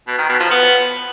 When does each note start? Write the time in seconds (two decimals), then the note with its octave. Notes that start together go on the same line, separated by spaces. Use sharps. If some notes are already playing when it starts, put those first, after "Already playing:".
0.08 B2
0.18 D#3
0.29 B2
0.40 F3
0.51 B3